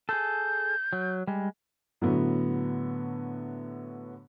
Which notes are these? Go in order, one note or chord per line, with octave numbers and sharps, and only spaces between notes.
G#4 A4 G6
F#3
G3 G#3
A2 D3 F#3 B3